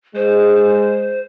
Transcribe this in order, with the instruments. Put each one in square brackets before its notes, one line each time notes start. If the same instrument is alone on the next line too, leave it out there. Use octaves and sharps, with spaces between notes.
[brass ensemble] G#3 [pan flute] C5